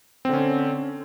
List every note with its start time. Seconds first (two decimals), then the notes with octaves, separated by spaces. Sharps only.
0.25 C4
0.29 D3
0.33 C#4